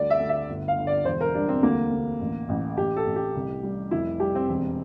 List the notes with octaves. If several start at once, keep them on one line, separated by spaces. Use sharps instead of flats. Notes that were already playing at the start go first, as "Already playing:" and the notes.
Already playing: D2 G3 D5
E5
D2
E5
G1
F5
G1
D5
E1 C5
A#4
G3 D4
C4
D2 A#3
D2
A1
A1
A1 G4
A4
A1
G4
C2
G3
F1 E4
G3 G4
C4
E1